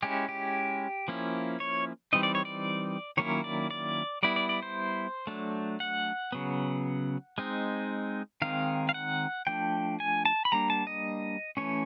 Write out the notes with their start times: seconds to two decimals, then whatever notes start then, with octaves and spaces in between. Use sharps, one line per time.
0.03 G#3 C#4 E4 G4
0.29 G4
1.08 F3 A#3 C#4 E4
1.60 C#5
2.13 E3 G3 C4 D#4 D#5
2.23 D5
2.35 C#5
2.45 D5
3.17 D#3 F#3 A#3 C#4 E4 C#5
3.44 D5
3.71 D5
4.23 G3 B3 E4 D5
4.36 D5
4.49 D5
4.62 C5
5.27 F#3 A3 D4
5.80 F#5
6.32 C#3 F#3 B3
7.38 G#3 C4 D#4
8.42 D#3 G#3 C4 D#4 F5
8.89 F5
8.94 F#5
9.47 F3 A3 D4 G5
10.00 G#5
10.25 A5
10.45 B5
10.52 G3 A#3 D4 A#5
10.70 A5
10.87 D#5
11.57 E3 A3 C#4 C#5